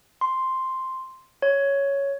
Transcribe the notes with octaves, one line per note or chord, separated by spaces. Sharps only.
C6
C#5